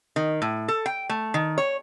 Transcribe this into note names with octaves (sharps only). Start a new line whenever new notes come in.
D#3
A2
A4
G5
A3
D#3
C#5